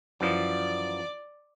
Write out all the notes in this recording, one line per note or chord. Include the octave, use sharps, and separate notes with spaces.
F#2 E3 F3 D5